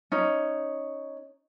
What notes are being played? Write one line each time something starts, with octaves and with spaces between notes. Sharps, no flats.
C#4 D#4